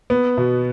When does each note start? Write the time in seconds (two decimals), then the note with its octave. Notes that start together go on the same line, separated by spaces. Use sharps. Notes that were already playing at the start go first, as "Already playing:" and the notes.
0.10 B3
0.38 B2